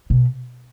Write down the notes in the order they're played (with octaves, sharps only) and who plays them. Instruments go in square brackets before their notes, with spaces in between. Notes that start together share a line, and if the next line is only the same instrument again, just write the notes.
[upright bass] B2